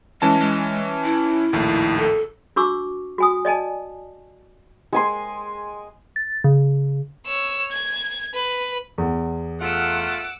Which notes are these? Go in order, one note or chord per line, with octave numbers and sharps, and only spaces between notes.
E3 G#3 C#4 A5
G#3
E4
A#1 D#2 A2
A4
D4 F#4 C#6 D6 E6
F#4 G#5 D#6
D5 D#5 G#5 A5
G#3 G#5 C6
A6
C#3
C#5 E6
G#6
B4
E2
A3 F4 F#5 D6 E6